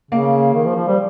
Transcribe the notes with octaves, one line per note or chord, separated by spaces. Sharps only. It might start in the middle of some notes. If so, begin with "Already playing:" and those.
C#3 A#3
D#3
F3
F3
G3